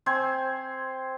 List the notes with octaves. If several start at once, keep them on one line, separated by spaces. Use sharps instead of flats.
C4 C5 G#5